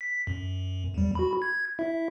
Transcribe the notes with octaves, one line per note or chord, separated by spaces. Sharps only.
B6
F#2
E2 G3
F#4 B5
G#6
E4 E5